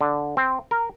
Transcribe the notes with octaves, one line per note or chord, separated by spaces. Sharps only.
D3
C4
A#4